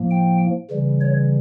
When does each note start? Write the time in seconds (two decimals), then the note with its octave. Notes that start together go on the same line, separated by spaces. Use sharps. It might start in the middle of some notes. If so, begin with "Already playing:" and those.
Already playing: A2 F3 A#3
0.11 G5
0.70 C#3 E3 G3
1.01 C#5